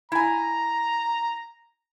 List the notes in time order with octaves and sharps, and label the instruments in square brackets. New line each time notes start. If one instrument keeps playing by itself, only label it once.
[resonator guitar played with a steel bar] E4 G#5 [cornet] A#5